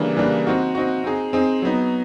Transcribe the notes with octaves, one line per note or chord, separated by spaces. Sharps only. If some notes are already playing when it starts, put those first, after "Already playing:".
Already playing: C#3 E3 G3 A#3 D4
C#3 E3 G3 A#3 D4
C4 D#4 F#4
C4 D#4 F#4
C4 D#4 G#4
C4 D#4 G#4
F#3 B3 D#4